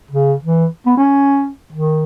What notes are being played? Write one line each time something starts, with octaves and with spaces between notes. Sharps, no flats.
C#3
E3
B3
C#4
D#3